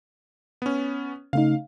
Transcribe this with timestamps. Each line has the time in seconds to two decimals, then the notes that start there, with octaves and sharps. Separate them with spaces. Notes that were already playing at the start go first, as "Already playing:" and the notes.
0.62 B3 C#4
1.33 C#3 A3 D#4 F5